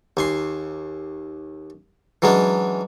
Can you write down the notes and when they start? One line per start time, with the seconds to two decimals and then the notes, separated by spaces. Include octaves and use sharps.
0.17 D#2 G#5 C6
2.22 E3 F#3 G#3 C#4 D4